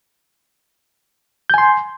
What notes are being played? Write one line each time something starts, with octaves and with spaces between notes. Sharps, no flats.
G#5 C6 G6